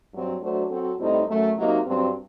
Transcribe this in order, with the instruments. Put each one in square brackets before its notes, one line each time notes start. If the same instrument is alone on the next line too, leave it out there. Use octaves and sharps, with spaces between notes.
[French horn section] G2 F#3 C4
F#3 A3 D4 F#4 C5
F#3 C4 F#4 A4
A2 G3 C4 D#4
F#2 F#3 A3
C3 F#3 A#3 D#4
G2 F#3 C4